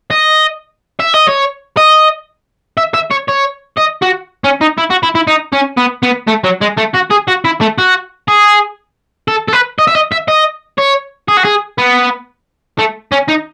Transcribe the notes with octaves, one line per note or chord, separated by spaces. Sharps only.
D#5
E5
D#5
C#5
D#5
E5
E5
C#5
C#5
D#5
F#4
C#4
D#4
E4
F#4
E4
E4
D#4
C#4
B3
B3
A3
F#3
G#3
A3
F#4
G#4
F#4
E4
A3
F#4
G#4
A4
A4
B4
D#5
E5
D#5
E5
D#5
C#5
G#4
F#4
G#4
B3
A3
C#4
D#4